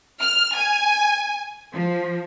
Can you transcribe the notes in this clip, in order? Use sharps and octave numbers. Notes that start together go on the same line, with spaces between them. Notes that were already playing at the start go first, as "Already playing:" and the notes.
F6
G#5
F3